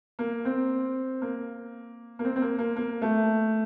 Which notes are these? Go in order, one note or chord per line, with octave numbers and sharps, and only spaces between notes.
A#3
C4
A#3
A#3
C4
C4
A#3
A#3
A#3
A3